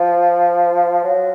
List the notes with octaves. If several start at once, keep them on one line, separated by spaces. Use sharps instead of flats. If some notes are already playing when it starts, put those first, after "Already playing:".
Already playing: F3
F#3